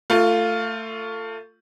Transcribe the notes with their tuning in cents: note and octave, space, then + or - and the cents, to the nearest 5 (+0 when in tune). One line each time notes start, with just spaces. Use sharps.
A3 +25 F4 +0